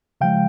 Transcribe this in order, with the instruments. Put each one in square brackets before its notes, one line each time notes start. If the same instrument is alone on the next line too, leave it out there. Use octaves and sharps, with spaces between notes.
[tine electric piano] C#3 F3 G#3 F5 G5